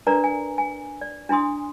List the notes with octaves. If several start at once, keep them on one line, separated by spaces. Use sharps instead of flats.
D4 A#4 B4 D5 A#5
G#5
G#5
D5
D4 E4 G#5 C6 D#6